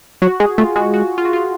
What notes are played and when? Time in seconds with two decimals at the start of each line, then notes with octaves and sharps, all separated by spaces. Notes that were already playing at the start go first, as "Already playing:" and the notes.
0.22 F#3 F#4
0.40 G#3 G#4
0.58 A3 F4
0.76 G#3 F#4
0.94 F#4
1.18 F4
1.25 F#4
1.33 F4